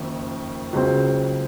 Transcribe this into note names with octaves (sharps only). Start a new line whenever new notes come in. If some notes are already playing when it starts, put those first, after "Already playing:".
Already playing: F#1 F2 D#3
C#2 C#3 F#3 C4